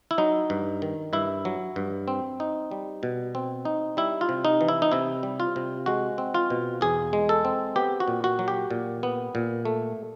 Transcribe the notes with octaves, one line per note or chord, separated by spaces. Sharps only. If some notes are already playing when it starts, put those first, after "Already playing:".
E4
F#3 D#4
G2
D#3
G2 E4
F#3
G2
C4
D#4
G3
B2
C4
D#4
G3 E4
F4
C3
D#4
E3
E4
D#4
C3 E4
G3
F4
C3
G#3 F#4
C4
F4
B2
E2 G#4
G#3
A4
C4
B3 G4
F#4
A#2
F#4
F#3
G4
A#2
B3
A#2
A3